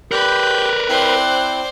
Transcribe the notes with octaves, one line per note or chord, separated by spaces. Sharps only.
G4 A#4 B4 D5 B5 F#6 G6
C4 E4 C5 D5